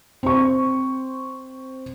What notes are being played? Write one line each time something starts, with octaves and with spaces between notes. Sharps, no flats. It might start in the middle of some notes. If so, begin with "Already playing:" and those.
C4 C#6